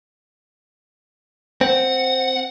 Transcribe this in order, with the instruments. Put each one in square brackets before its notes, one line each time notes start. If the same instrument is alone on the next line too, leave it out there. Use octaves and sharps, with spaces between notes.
[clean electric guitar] C4 [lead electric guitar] F#5